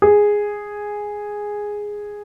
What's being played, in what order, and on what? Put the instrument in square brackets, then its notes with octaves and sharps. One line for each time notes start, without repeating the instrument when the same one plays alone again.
[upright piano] G#4